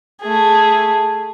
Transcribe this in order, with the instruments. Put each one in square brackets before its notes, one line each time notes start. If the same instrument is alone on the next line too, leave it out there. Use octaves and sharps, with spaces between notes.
[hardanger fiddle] A3 G#4